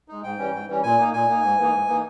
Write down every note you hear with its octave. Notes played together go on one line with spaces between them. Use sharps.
G#3 D#4
G#2 G5
E3 G3 C#4
G#2
E3 G3 C#4
A#2 G#5
A#3 D#4
A#2 G#5
A#3 D#4
G#2
E3 A#3 D#4
G#2
E3 A#3 D#4